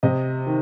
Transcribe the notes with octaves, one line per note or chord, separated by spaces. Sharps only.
C3 D#5
D#3